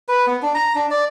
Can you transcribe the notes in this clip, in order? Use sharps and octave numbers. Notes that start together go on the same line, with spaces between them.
B4
B3
D4
A#5
D4
D5